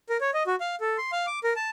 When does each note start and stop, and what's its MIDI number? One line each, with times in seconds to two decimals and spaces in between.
0.10 0.17 70
0.21 0.31 73
0.34 0.43 75
0.47 0.56 66
0.60 0.75 77
0.81 0.97 69
0.98 1.11 84
1.12 1.26 77
1.27 1.39 86
1.44 1.53 70
1.56 1.70 81